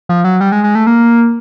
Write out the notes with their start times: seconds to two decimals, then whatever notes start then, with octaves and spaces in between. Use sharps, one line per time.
0.09 F3
0.24 F#3
0.41 G3
0.52 G#3
0.64 G#3
0.75 A3
0.87 A#3